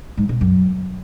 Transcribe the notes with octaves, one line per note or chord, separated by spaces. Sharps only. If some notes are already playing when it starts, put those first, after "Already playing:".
G#2
B2
F#2